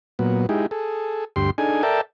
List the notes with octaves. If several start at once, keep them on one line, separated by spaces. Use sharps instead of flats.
A#2 F#3 B3
G#3 D#4 E4 G4 G#4
G#4 A4
D2 G2 G4 C6
D4 D#4 G#4 A4 G#5
A4 A#4 D5 E5 G5 A5